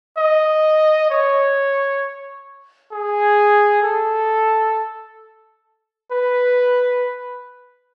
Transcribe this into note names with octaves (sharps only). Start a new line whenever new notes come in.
D#5
C#5
G#4
A4
B4